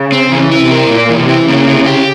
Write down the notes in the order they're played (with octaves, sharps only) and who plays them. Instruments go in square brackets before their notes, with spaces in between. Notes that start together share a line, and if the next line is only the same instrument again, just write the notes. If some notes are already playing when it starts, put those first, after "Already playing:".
Already playing: [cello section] C#3
[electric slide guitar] C4
[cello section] C#3 [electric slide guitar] E3
[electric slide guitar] E4
[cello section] C3
[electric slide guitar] A#4
[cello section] A#2 [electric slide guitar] A#3
[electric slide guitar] E3
[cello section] C3
[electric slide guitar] E4
[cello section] C#3 [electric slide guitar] A#3
[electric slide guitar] E4
G4